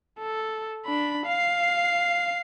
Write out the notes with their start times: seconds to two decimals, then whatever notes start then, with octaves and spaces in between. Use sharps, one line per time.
0.19 A4
0.86 D4 B5
1.26 F5 C7